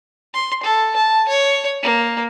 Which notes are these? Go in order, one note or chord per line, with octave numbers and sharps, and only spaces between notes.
C6
A4
A5
C#5
A#3